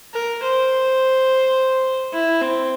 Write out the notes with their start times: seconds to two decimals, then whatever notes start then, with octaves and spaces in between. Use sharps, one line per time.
0.14 A#4
0.42 C5
2.13 E4
2.41 C4